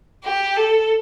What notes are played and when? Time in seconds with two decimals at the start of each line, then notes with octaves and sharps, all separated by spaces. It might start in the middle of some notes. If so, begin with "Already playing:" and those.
0.24 G4
0.56 A4